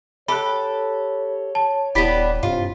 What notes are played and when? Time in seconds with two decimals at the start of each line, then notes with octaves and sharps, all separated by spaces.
0.28 G4 A4 C#5 B5 F#6
1.55 A5
1.95 D#1 B3 D4 E4 G4 B5 B6
2.43 G2 C3 F4